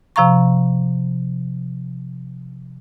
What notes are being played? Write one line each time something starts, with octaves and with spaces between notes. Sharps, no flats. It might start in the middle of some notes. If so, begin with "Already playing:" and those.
C3 F3 F5 A#5 C#6